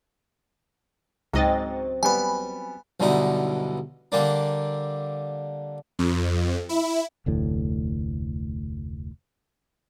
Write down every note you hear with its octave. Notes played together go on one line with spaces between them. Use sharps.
C#2 G#2 F#3 C4 C#4 D#5 A6
G3 B3 G#5 B5
B1 G2 B2 D3 D#4 E4
D3 G3 A#3 D4
F2
E4
F1 D2 A2